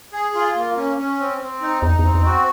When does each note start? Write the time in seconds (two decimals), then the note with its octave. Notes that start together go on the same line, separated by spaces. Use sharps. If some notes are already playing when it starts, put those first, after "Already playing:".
0.13 G#4
0.35 F4
0.56 A#3
0.77 C#4
0.98 C#4
1.19 C4
1.41 C4
1.61 D#4
1.82 E2 D#4
1.99 E2 C4
2.14 E2
2.25 F#4